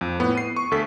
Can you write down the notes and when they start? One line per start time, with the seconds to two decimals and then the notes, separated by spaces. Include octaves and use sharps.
0.01 F2
0.20 A2 B3
0.35 C7 D#7
0.56 C#6
0.71 D2 A4 B6